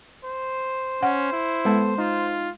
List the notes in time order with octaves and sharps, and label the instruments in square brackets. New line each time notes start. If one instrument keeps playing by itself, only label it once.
[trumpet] C5
[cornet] C#4 [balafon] F#5
[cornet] E4
[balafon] G#3 [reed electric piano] B3 A4
[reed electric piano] D#4 [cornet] F4